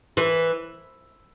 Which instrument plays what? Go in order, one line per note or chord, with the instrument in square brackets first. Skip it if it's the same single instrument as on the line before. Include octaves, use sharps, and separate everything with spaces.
[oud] E3